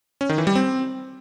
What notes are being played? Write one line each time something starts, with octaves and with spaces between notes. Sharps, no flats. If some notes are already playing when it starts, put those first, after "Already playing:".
C#4
D#3
E3
G3
C4